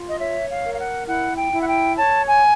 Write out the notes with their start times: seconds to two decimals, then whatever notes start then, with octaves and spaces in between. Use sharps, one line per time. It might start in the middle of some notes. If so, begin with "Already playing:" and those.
Already playing: F4
0.09 D#5
0.19 C#5 E5
0.49 F5
0.64 A#4
0.74 F5
0.79 F#5
1.08 E4 F#5
1.38 G5
1.52 E4
1.62 F#5
1.68 G5
1.97 C#5 A5
2.27 G#5